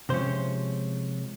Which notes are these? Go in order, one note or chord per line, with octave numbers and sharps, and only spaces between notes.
C3 F3 G#3 C#4 C5